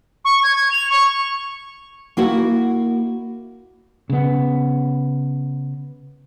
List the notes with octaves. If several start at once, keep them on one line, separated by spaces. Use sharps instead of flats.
C#6
G#6
G#6
F7
C#6
A#3 E4 F#4
C#3 B3